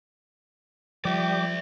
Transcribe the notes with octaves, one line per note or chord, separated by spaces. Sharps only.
F3 G3 D5 E5 G5 D6